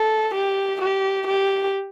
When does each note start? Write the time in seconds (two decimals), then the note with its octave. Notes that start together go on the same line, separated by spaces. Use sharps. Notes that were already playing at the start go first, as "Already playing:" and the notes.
Already playing: A4
0.35 G4
0.82 G4
1.27 G4